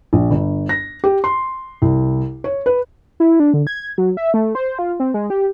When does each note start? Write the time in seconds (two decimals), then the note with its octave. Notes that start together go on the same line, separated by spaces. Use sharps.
0.13 A#1
0.31 G1
0.69 A#6
1.04 G4
1.24 C6
1.82 C2
2.44 C#5
2.66 B4
3.20 E4
3.40 D4
3.54 D3
3.67 G#6
3.98 F#3
4.17 E5
4.34 A3
4.55 C5
4.79 F4
5.00 C4
5.14 G#3
5.30 G4